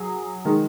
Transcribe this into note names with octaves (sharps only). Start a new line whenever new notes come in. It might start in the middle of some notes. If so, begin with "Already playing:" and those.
Already playing: F#3 G#4
D#3 G#3